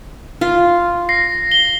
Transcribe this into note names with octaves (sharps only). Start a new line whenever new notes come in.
F4
A#6 C7
G7